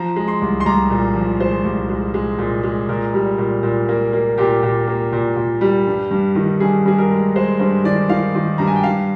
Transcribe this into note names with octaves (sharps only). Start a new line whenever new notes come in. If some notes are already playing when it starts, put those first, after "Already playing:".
Already playing: F3 A#5
G#3
C6
C2
C6
C2 A#5
A#2
F3
G#3 C5
C2
G#3
G#3
A#2
G#3
A#2 A#4
G3
A#2
A#2
A#3
A#3
A#2 G4
A#2
A#3
A#2
A#2
G3
G2
G2
D#3
G2 G#4
G2 G#4
A#4
G#3
G#3 C5
G2 C5
D#3 D5
D#3 F5
D#3
G2 A#5
G#5
G5
G2 F5